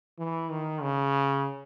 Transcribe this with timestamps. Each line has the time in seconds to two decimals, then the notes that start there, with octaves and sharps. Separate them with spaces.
0.19 E3
0.50 D#3
0.82 C#3